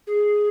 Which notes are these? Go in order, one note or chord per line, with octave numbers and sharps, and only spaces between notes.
G#4